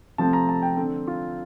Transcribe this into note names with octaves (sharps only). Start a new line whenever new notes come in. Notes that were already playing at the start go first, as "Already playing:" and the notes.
C3 F3 A3 C4 A5
A#5
A5
G5
D3 A3 C4 A4
F4